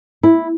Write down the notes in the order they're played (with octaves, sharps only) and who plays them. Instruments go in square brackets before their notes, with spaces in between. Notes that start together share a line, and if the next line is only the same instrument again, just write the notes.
[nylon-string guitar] E4